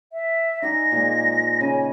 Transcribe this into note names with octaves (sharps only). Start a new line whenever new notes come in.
E5
D#4 D5 G#5 A#6
A#2 F3 G#3
C#3 G#5